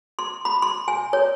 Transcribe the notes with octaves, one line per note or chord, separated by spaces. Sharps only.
C6
B5
C6
G#5
C#5